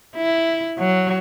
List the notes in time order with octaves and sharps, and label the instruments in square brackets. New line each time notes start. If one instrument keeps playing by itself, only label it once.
[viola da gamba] E4
F#3